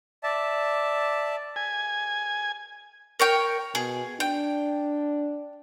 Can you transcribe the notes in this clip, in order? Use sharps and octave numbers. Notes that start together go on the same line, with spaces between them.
D5 E5 A5
G#5
A#4 C#5 G5
B2 G#4
D4 G5